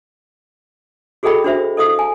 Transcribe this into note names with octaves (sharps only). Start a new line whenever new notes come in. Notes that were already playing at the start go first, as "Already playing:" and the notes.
F#4 G#4 A4 D#5 G5 B5
D4 F#4 C5 E5
A4 D#5 F5 D#6
G#5